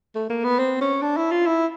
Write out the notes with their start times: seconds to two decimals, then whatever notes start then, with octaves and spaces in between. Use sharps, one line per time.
0.15 A3
0.30 A#3
0.44 B3
0.59 C4
0.81 C#4
1.02 D4
1.17 E4
1.31 F4
1.46 E4